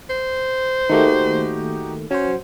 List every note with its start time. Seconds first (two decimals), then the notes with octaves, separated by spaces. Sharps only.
0.10 C5
0.90 D#3 A3 A#3 D#4 F#4 G4
2.11 F#3 C#4 F#4 C5